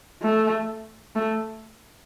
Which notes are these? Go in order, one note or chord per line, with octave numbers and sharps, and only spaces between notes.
A3
A3